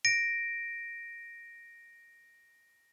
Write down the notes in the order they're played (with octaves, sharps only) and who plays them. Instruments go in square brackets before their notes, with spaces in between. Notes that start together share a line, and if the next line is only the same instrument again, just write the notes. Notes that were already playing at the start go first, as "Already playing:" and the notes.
[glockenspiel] A#6 D7